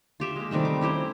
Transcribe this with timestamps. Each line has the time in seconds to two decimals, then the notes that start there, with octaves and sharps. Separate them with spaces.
0.20 F4 G4 E5
0.36 G#3 A#3
0.51 C3 D#3 G3 A3
0.65 D6
0.81 C#4 E4 G4 C5